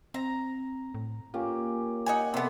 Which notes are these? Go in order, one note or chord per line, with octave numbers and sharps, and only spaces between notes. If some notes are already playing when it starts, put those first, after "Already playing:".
C4 A#5
A2
A#3 C#4 F4 G4
D#4 F#5 G#5
C3 B3 A4 C5 D5